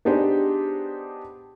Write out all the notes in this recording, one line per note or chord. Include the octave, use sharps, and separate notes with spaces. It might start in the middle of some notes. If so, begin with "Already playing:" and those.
B3 D4 D#4 G4 G#4 C5